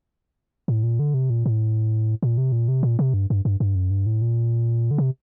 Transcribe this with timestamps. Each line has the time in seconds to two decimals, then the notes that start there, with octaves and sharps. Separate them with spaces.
0.68 A2
0.83 A#2
0.99 D3
1.14 C3
1.30 A#2
1.46 A2
2.23 A#2
2.38 C3
2.52 A#2
2.68 C3
2.83 A#2
2.99 C3
3.14 G2
3.30 G2
3.45 G2
3.60 G2
3.75 F#2
3.91 G2
4.06 A2
4.22 A#2
4.91 D3
4.98 C3